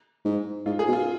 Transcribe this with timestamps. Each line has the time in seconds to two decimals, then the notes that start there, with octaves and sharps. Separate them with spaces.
0.25 G#2
0.66 G#2 F4
0.79 G#4
0.87 B2
0.93 F4